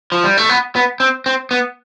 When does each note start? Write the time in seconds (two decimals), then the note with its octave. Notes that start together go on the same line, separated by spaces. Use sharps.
0.12 F3
0.24 G3
0.37 A3
0.49 B3
0.76 B3
1.00 C4
1.26 C4
1.51 B3